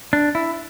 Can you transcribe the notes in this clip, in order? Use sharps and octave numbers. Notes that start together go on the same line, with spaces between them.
D4
E4